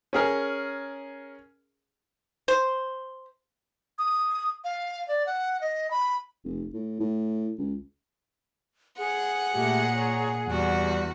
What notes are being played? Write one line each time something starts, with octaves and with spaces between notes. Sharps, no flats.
C#4 G#4 A#4
C5
D#6
F5
D5
F#5
D#5
B5
F1
A2
A2
C#2
G#4 F#5
A#2 A3 G4
C#5 A#5
E2 G3 F#4 F#5